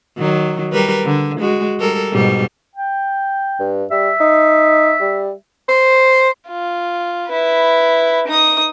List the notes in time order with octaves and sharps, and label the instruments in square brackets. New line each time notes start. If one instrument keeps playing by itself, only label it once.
[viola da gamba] D#3 F#3
G3 A#4 B4
D3
G#3 F#4
G3 A4 A#4
G#2 B2 G3
[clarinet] G5
[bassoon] G2
[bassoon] G3 [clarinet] E5
[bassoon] D#4
G3
[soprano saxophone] C5
[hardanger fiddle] F4
E4 B4
D#4 D#6